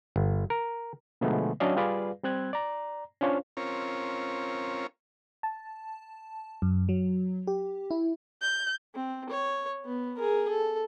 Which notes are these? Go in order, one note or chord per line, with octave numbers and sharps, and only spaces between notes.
G1
A#4
B2 D3 F3 G#3 A3 B3
F#3 C#4 D4 D5 D#5 F5
G3 F4 G#4 B4 D5 F5
G3 C4 F#6 G#6
D5 A#5
C#4 D4 F4 C5 C#5 F5
C4 C#4 F4 A#4 C#5
A5
F#2
F#3
G4
E4
G6
C4
C#5
B3
G#4 A#4
A4